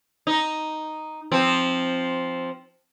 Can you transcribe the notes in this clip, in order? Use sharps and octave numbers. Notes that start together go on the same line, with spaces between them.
D#4
F3 C4